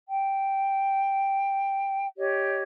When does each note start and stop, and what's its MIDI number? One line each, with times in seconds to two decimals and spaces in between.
0.08 2.08 79
2.17 2.62 67
2.17 2.62 73
2.17 2.62 75